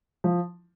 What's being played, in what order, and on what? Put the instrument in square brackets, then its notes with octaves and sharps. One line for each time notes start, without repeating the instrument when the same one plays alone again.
[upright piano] F3